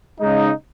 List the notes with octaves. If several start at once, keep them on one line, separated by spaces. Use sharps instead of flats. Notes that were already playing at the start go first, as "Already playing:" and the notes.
C#3 G#3 D#4